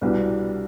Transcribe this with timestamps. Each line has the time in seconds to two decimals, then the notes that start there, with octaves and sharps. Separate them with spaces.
0.01 C2 B2 G3 B3 D4